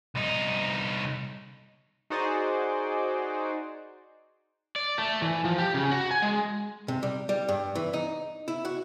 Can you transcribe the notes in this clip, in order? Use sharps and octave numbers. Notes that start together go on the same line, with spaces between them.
C2 D#4
D#4 F#4 G#4 C5 D5
D5
A3
E3
F3
G4
C#3
F#4
G#5
G#3
C3
G3
G3
G2
E3
D#4
E4
F#4